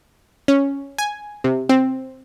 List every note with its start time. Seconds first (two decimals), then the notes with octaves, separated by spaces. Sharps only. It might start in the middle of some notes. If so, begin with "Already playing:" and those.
0.48 C#4
0.98 G#5
1.44 C3
1.69 C4